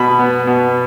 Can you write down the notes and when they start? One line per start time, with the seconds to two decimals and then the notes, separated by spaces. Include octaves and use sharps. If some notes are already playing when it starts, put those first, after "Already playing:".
Already playing: B2 B5
0.19 B3
0.47 B2